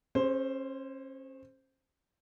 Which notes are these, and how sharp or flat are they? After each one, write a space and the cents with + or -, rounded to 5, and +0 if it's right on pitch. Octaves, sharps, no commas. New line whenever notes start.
C#4 -35 G#4 +10 C5 +0